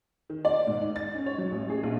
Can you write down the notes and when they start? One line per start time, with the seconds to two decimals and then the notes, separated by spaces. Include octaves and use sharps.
0.30 D#3
0.45 D5
0.67 G#2
0.82 D#4
0.96 A6
1.14 C#4
1.26 C#5
1.38 F#3
1.52 A1
1.70 G#4
1.83 A#1